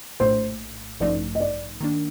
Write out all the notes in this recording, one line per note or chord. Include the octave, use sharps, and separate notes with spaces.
A#1 A2 A3 C5
A1 G2 F3 A3 D#4 D5
D#5
D5
D#3 A#3 D4